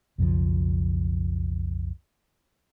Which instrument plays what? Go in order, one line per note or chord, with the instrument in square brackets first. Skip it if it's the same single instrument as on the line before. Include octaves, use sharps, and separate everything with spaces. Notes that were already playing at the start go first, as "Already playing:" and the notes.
[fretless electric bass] B1 F2 C#3 F3